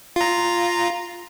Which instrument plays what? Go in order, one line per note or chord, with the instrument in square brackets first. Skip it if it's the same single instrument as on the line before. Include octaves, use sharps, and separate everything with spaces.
[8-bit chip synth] F4 A#5